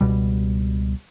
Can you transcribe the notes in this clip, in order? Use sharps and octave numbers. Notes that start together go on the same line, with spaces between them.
C#2 B2 G3